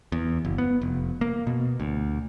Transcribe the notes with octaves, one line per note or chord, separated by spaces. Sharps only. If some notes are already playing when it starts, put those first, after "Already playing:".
E2
F#1
B3
F1
A#3
B2
D2